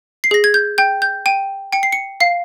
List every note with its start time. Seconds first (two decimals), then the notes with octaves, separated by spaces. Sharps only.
0.24 C7
0.31 G#4 A#6
0.44 G#6
0.54 G6
0.78 G5 G6
1.02 G6
1.26 G5 D#7
1.73 G5 C#7
1.83 C7
1.92 C#7
2.20 F5 C7